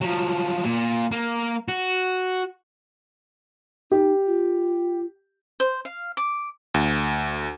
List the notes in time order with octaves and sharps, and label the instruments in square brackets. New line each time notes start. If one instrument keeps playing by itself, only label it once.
[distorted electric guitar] F3 F#3
A#2
A#3
F#4
[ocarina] D#4 [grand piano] G4
[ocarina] F4
[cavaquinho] C5
F5
D6
[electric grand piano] D2